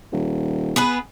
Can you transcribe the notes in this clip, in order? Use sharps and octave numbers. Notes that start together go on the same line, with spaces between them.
D#1
B3 G#4 B4